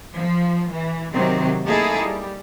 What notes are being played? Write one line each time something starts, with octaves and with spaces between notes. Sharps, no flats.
F3
E3
C3 D#3 F#3 C4
A3 A#3 D#4 E4 G#4 A4
G3